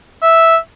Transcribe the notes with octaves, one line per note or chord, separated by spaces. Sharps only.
E5